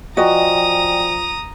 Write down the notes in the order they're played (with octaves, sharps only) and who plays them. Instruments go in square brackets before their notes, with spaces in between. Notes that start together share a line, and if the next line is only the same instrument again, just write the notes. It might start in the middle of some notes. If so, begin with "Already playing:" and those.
[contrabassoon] F3 [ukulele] F#4 D#5 [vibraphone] D5 G5 G#5 [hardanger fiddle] A#5 D#6